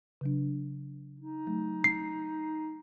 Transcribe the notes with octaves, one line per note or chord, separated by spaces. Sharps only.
C#3 F#3 D4
D#4
F#3 A3
C7